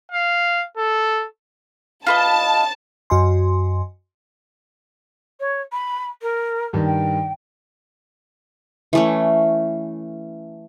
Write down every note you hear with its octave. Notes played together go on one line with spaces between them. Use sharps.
F5
A4
F4 B4 D#5 A5
F#2 F#4 D#5 G#5 C6
C#5
B5
A#4
G2 D#3
G5
E3 A3 C#4